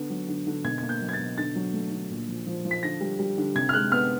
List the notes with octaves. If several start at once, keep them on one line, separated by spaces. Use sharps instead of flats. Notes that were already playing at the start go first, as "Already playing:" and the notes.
Already playing: D3 B3
F#3
D3
D3
B2 G#6
A#3 G#6
G6
F#3
G#6
A6
B2
D3 A6
F#3
A3
D3
A#2
F3
F3
F3
B6
D3 A#6
G3
G3
D3
C3 G#6
F6
G#3 F#6
B3 F6